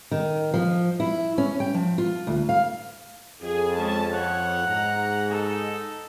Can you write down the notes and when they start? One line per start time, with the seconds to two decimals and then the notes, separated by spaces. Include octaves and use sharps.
0.11 D#3
0.54 F3
1.00 E4
1.38 C#4
1.60 G5
1.74 F3
1.98 F4
2.27 D2
2.49 F5
3.42 F2 G#4 G#5
3.77 G#3 C#4 G#4 A5
4.11 F3 C#5 F#5
4.66 G#2 A#5
5.30 D#4 A4